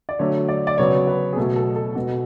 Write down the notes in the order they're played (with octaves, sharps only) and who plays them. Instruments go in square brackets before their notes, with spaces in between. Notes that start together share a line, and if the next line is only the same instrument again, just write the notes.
[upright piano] D5
D3 F#3 A3 C#5
D5
D5
C#3 F#3 B3 C#5
B4
G#4
B2 F#3 A3 A4
A4
A4
B2 G#3 B3 F#4